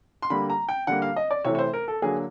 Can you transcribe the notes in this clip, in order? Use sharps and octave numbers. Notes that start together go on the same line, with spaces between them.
C6
D3 G3 A#3 B5
A#5
G5
D3 G3 A#3 F#5
F5
D#5
D5
C3 E3 A3 C#5
C#5
C5
A#4
A4
D3 F#3 A#3 G#4